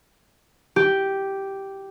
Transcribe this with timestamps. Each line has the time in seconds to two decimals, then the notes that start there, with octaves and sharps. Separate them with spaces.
0.76 G4